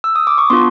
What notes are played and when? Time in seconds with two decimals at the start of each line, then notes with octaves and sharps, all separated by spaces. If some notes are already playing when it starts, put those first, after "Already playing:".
0.04 E6
0.16 D#6
0.27 D6
0.38 C#6
0.50 B3 D4 F4 C6